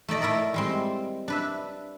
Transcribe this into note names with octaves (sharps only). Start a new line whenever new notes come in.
A3 D#4 D5 D#5
A3 E4 A#4 D5 D#5
G3 G#3 C4
D4 B4 E5